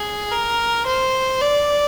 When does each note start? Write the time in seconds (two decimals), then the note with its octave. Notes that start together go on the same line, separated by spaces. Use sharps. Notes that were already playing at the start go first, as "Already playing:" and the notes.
Already playing: G#4
0.31 A#4
0.86 C5
1.42 D5